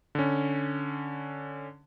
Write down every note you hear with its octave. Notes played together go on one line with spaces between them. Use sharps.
D3 C#4